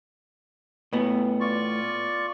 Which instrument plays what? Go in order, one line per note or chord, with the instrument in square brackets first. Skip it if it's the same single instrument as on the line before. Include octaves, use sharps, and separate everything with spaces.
[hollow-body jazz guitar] A2 B3
[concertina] F4 D5 C#6